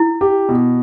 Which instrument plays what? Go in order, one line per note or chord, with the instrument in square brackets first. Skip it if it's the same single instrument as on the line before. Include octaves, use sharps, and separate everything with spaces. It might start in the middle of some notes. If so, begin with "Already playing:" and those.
Already playing: [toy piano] E4
[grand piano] G4
B2